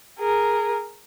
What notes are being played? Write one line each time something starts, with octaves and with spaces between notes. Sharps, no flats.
G#4 A#4